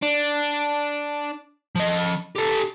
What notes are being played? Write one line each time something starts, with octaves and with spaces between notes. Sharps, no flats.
D4
F3 D#5
G4 A4